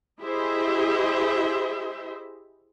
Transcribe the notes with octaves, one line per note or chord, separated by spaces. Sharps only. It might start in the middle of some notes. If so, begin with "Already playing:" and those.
E4 G4 G#4 C5 D#5 E5